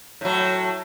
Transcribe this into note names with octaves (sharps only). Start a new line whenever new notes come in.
A2 F#3